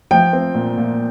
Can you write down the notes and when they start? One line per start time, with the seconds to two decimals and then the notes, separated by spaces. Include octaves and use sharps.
0.11 F3 G5
0.33 C4
0.55 A#2
0.77 A#2